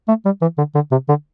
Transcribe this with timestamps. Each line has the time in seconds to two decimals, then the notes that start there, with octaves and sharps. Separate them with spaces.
0.08 A3
0.25 G3
0.42 E3
0.58 D3
0.75 D3
0.92 C3
1.09 D3